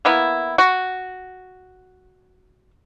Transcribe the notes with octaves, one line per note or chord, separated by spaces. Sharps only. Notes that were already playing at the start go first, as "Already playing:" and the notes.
A#3 B3 E4
F#4